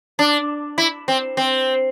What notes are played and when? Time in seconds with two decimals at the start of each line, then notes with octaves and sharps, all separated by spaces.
0.19 D4
0.78 E4
1.08 C4
1.37 C4